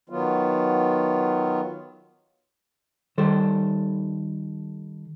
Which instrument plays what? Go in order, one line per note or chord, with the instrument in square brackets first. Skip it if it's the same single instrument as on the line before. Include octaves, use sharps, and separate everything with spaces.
[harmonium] D#3 F#3 B3 F4
[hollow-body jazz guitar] D#3 G3 A4 C5